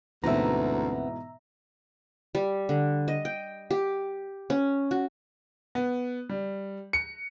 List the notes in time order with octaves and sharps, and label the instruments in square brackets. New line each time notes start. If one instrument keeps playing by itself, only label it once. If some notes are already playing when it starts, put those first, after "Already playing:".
[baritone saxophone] D2 [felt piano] G#2 B2 E3 [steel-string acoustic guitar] B3 C4 [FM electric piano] E5 A#5
[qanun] G3
D3
D#5
G5
G4
C#4
F#4
[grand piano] B3
G3
C#7